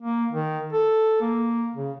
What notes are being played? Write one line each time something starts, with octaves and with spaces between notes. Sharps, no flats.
A#3
D#3
A4
A#3
C#3